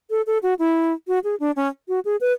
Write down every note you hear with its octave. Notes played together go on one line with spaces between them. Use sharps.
A4
A4
F#4
E4
F#4
G#4
D4
C#4
F#4
G#4
B4